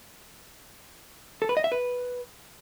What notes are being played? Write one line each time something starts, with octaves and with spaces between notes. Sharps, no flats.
A4
B4
D#5
E5
B4